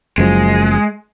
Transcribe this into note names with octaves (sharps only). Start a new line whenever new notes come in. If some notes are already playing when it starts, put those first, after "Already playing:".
F#1 F#2 F3 G#3